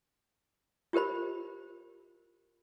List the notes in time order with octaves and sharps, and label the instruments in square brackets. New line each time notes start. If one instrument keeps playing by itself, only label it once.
[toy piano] F4 G4 A#4 C5 B5